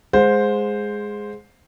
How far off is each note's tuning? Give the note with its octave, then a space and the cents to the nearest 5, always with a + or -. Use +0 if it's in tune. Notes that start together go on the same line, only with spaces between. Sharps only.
G#3 +0 C5 +0 F#5 -45